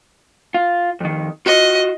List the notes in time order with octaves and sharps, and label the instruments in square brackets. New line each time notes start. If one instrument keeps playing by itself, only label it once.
[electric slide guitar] F4
F2 D#3
[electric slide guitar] F4 F#4 [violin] D#5